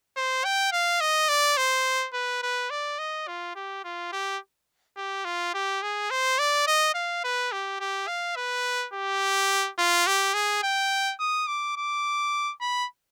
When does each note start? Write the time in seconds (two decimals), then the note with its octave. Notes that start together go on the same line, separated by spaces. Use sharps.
0.16 C5
0.45 G5
0.72 F5
1.01 D#5
1.29 D5
1.57 C5
2.14 B4
2.43 B4
2.70 D5
2.99 D#5
3.28 F4
3.55 G4
3.85 F4
4.12 G4
4.97 G4
5.25 F4
5.54 G4
5.82 G#4
6.11 C5
6.39 D5
6.67 D#5
6.95 F5
7.24 B4
7.52 G4
7.80 G4
8.08 F5
8.36 B4
8.94 G4
9.78 F4
10.07 G4
10.34 G#4
10.63 G5
11.20 D#6
11.47 D6
11.76 D6
12.61 B5